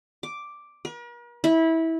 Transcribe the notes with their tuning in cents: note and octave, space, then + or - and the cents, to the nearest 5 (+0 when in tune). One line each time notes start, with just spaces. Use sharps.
D6 +0
A#4 +45
E4 -20